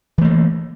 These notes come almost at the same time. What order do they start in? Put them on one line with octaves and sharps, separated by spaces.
E3 A3 A#3